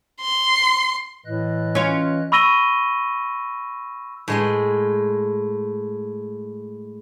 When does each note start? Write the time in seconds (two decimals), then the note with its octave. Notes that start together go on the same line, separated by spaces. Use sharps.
0.21 C6
1.26 A2 E3 D#5 F#6
1.75 C#4 F4
2.32 B5 C#6 E6 A#6 D#7 G7
4.28 A2 G#3 G#5